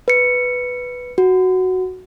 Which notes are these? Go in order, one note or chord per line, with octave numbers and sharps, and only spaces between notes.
B4 C#7
F#4